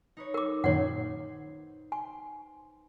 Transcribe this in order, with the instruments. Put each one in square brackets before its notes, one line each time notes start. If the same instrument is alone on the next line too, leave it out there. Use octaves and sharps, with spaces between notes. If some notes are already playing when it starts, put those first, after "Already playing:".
[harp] D#4 B4 C#5
[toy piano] A#4 D6
[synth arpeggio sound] F#2 A#2 D#3 [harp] C5 G#6 C7 [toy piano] C#5 F#5
[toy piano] G#5 [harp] C6